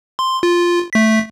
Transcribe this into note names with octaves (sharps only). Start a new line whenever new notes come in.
C6
F4
A3 B6